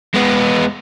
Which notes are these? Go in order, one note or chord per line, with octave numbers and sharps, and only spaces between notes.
G#3 B3